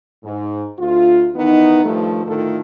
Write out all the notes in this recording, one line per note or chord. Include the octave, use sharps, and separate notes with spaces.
G#2
D2 F4
D#3 E3 B3 D#4
G2 D#3 F3 A3
A2 D3 D#3 A3 F4 A4